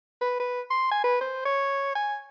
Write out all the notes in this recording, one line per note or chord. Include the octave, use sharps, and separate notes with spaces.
B4
B4
C6
G#5
B4
C5
C#5
G#5